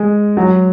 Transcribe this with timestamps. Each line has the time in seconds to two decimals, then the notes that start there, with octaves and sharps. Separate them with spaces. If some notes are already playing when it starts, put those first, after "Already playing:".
Already playing: G#3
0.37 F#3